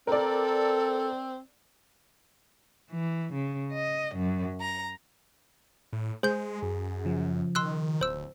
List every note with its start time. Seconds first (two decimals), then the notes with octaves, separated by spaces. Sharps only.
0.07 C4 A4 A#4 D5
2.91 E3
3.33 C#3
3.73 D#5
4.16 F#2
4.61 A#5
5.93 A2
6.23 G#3 G#4 C5 G6
6.62 F#2
7.05 C#3 F3
7.55 D#3 C6 E6 F#6
8.01 D1 C5 E6